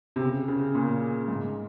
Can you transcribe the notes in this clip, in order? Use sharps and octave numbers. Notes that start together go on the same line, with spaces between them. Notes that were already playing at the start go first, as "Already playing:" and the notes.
C3
C#3
C#3
A#2
G#2